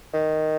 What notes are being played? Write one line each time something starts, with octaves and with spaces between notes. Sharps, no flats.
D#3